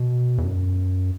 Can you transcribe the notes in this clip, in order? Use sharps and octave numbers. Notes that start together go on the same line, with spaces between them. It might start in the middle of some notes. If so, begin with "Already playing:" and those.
Already playing: B2
E2
F#2